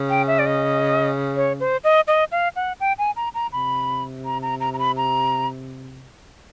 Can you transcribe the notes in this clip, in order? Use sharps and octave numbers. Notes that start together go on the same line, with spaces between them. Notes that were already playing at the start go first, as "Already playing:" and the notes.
Already playing: C#3
G5
E5
D5
D#5
C#5
C5
D#5
D#5
F5
F#5
G5
G#5
A#5
A#5
C3 B5
A#5
A#5
A#5
A#5
B5
A#5